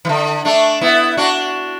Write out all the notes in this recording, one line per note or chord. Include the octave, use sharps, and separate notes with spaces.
E3
D3
A3 D4
B3 E4
D4 F#4